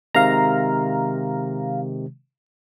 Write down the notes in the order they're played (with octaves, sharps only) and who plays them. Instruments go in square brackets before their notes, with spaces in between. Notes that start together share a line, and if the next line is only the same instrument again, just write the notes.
[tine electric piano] C3 D#3 G#3 [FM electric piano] F5 A#5